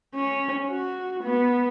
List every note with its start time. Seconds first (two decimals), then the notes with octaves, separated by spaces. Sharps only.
0.15 C#4
0.70 F#4
1.24 B3